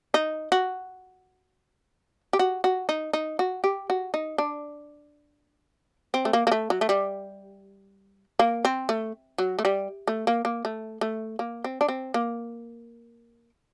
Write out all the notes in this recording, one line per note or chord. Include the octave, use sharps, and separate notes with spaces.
D#4
F#4
G4
F#4
F#4
D#4
D#4
F#4
G4
F#4
D#4
D4
C4
A3
A#3
A#3
A3
F#3
A3
G3
A#3
C4
A3
F#3
A3
G3
A3
A#3
A#3
A3
A3
A#3
C4
D4
C4
A#3